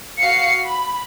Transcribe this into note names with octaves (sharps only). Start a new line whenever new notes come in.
F#4 F5 C7 C#7
B5